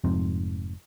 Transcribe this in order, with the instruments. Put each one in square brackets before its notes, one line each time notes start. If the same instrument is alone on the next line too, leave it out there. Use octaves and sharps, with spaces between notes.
[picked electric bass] F1 F2 G#2 C4